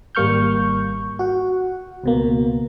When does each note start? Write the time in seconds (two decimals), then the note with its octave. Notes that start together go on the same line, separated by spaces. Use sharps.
0.15 G#1 G3 A#3 C#6 F6 G6
1.19 F#4 F#5
2.04 C#2 B2 A#3